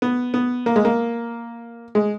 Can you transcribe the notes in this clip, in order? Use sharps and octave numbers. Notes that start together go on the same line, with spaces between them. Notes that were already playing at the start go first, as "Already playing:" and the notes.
B3
B3
A#3
G#3
A#3
G#3